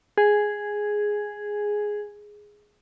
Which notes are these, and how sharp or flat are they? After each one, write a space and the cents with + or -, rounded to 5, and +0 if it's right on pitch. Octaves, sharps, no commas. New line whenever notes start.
G#4 +0